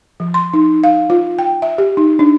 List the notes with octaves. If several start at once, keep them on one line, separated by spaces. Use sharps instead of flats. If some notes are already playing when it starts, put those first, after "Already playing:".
F3
C6
D#4
F5
F4
G5
E5
G4
D#4
D4